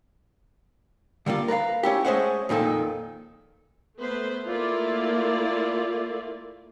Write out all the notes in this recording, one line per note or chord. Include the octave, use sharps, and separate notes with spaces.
D3 G3 A#3 F4
A#4 B4 D5 F5
C#4 E4 G4
G#3 A3 C#4 C5 E5 F#5
F2 A#2 D#3 A4
A3 B3 B4 C5
A3 A#3 E4 F4 D5